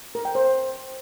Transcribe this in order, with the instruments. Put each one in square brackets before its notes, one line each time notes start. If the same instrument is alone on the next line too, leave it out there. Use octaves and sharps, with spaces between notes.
[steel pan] A#4
G5
C5